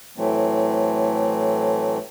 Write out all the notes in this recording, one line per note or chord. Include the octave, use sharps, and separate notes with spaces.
A2 E3 F#3 A3 C4